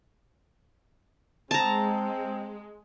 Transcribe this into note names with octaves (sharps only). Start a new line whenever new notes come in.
G#3 C4 A5 A#5